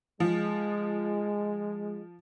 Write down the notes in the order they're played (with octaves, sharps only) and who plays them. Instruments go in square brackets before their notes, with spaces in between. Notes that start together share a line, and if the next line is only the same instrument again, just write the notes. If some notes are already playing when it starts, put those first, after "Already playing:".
[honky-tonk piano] F3 [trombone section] G#3